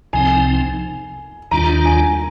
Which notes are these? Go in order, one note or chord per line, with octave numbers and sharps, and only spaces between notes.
C2 C3 F3 C4 D#4 G#5
D#2 D#3 G3 D4 F4 A#5
G#5